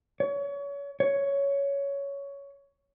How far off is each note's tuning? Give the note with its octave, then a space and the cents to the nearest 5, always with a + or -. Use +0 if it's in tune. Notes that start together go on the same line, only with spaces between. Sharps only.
C#5 +30
C#5 +10